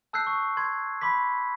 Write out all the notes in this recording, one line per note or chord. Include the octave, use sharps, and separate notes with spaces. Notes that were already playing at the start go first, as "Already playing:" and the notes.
A5 E6 F#6 G6 C7
C#6
C6 G#6
B5 C6 D6 B6